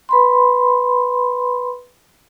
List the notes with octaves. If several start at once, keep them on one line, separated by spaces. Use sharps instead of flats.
B4 B5 C6